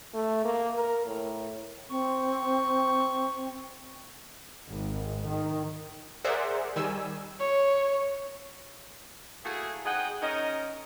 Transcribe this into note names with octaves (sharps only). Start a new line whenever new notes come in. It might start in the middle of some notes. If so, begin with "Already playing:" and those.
A3
A#3
A#4
A2
C4 C#6
G#1
D#3
G#4 A#4 C5 D5 E5 F#5
D#3 G3 G#5 E6
C#5
A3 A#3 E4 F#4 G#4
G#2 G#4 D#5 F#5 G5
C#4 D#4 A#4 D#5